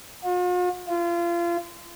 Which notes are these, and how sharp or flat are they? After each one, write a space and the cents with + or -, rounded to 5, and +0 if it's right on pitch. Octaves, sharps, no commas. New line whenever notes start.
F4 +45
F4 -30